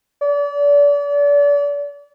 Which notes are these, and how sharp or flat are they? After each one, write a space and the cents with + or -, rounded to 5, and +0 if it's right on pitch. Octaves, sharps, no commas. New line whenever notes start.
D5 -35